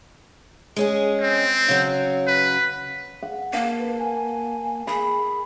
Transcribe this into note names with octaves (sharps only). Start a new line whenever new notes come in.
G#3 C#4 G#4
C4
C#3 F#3
B4
F#5
A#3 A#4 F5 F#5 A5
B4
G#5
G#4 B5